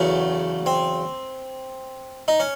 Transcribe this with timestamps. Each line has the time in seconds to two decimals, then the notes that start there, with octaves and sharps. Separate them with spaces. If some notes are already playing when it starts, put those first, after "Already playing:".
Already playing: E2 C#3 F#3 A3
0.66 C4
2.28 D#4
2.40 C#4